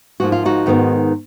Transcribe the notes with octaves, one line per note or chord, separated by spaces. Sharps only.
G#2 F3 A#3 F#4
F4
D#4 F#4
G#2 D#3 G#3 B3